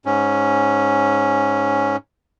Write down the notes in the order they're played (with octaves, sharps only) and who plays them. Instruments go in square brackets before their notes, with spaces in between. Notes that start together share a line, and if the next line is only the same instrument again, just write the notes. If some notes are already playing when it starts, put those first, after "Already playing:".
[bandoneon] G#2 C#4